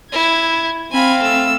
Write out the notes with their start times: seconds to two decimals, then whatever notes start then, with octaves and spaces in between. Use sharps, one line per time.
0.12 E4 G#6
0.92 C4 F5 G#5 B5
1.21 A3 E6